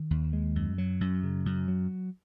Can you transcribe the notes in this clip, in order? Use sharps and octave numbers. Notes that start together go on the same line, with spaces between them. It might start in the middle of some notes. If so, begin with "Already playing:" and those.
Already playing: D#3
D#2
G#3
F#2
F#3
F#2
C#3
F#2
F#3